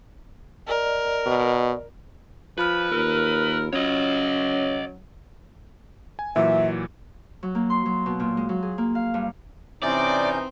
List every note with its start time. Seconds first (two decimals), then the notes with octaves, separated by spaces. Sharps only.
0.68 A#4 D5 D#5
1.26 B2
2.58 F3 F4 B4 B5 F6
2.91 D#2 A#4
3.73 F#3 C#4 C#5 D#5
6.19 G#5
6.36 A#2 E3 F#3 E5
7.43 F#3
7.55 A#3
7.70 C6
7.86 F#3
8.06 B2
8.20 A#2
8.37 G#3
8.49 F#3
8.63 G#4
8.78 A#3
8.95 F5
9.14 G2
9.83 C3 E3 C4 C#4 D#4 D5 G6